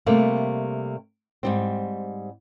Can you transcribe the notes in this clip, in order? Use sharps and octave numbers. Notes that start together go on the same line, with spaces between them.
C3 G3 A3 A#3
G#2 G3 C4